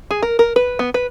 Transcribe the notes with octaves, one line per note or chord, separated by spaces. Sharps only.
G#4
A#4
A#4
B4
B3
B4